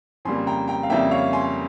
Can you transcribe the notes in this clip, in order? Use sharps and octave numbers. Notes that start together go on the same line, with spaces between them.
F2 C#3 G3 A#3 G#5 C6
G5 A#5
G5 A#5
F5
F2 C#3 G3 A#3 E5 G5
C#5 F5
G#5 C6